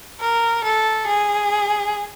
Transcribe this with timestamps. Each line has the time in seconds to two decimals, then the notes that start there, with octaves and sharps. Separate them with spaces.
0.20 A#4
0.64 A4
1.07 G#4